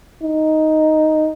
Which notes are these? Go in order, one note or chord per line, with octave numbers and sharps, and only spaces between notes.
D#4